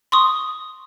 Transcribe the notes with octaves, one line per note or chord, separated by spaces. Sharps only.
C6 C#6 D#6